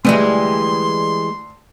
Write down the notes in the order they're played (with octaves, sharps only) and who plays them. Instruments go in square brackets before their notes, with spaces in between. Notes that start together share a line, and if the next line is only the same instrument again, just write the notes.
[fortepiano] D2 [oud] E3 G3 G#3 [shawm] C6